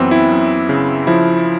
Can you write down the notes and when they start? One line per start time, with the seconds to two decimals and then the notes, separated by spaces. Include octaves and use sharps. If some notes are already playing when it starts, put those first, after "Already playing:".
Already playing: F#2 E3 B3 C4
0.11 E4
0.31 F#2
0.69 C#3
1.07 F3 E4